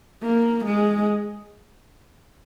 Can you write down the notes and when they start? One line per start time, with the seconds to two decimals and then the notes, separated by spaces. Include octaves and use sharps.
0.22 A#3
0.65 G#3